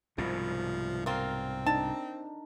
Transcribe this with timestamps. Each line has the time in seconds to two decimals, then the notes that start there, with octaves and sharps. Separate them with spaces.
0.18 C2 G#2 B2 F3
1.06 A#3 C4 F4 A#4
1.66 D4 D#4 A5